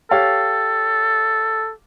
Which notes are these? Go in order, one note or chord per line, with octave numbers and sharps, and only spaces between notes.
G4 A4 C#5 F5